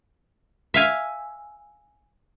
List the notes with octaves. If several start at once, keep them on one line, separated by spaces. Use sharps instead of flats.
E5 F5 G#5